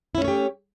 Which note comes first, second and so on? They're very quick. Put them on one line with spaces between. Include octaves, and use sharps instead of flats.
E4 C#4 A3 C#5 G4